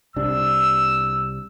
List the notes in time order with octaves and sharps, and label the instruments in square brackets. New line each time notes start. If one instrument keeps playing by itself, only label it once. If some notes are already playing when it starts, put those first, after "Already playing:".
[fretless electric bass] C2 C3 D4 [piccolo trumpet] E6